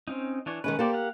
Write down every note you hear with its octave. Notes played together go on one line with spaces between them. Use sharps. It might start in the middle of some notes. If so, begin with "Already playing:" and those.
C4 C#4 D#4
E3 D4 C#5
D#3 G#3 C#4 B4
A#3 G4 A4 C5 D5
F5 F#5